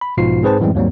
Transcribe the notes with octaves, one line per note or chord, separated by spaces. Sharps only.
B5
B1 G#2 B2 F3 F4 C7
G#2 C4 G#4 B4 C5 A5
F#2 A2 E3 G3 G#3 C4
D#2 G#2 F#3 G3 A#3 C4